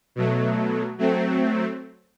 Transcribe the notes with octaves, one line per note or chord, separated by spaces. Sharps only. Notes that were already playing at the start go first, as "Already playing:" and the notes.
B2 F#3 A3
F#3 A3 C4